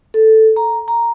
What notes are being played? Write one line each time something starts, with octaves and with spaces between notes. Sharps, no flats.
A4
A#5
A#5